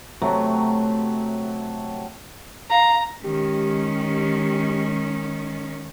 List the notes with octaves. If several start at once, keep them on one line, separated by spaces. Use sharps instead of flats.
C3 F#3 A3
F5 A#5
D#3 G#3 C#4 G4